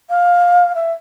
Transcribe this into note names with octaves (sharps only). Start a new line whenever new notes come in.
F5
E5